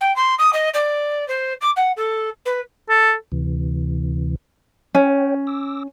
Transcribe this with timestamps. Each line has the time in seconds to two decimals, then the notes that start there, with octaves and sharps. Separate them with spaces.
0.01 G5
0.16 C6
0.38 D#6
0.53 D#5
0.74 D5
1.28 C5
1.61 D6
1.76 F#5
1.96 A4
2.45 B4
2.89 A4
3.32 D2 C3 E3
4.95 C#4 C#5 G5
5.47 D6 E6 A#6